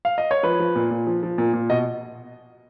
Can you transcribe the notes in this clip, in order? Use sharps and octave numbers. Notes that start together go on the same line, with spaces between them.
F5
D#5
C#5
F3 B4
F3
A#2
A#2
F3
F3
A#2
A#2
B2 D#5